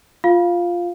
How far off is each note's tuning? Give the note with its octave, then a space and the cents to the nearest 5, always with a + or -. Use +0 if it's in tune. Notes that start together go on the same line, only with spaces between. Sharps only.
F4 +0 F5 +0